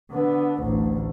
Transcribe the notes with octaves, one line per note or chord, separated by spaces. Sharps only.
D3 B3
A1 D2